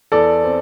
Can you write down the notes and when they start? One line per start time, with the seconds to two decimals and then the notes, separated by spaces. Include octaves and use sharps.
0.12 E2 A4 D5
0.44 C4